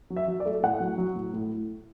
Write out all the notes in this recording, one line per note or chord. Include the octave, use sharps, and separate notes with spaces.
F#3
E5
F#3
D5
A3
A2 F#5
F#3
F#3
A2
A2